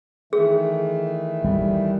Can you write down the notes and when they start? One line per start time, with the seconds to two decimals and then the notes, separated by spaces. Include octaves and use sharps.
0.33 D#3 E3 A3 G#4
1.44 G3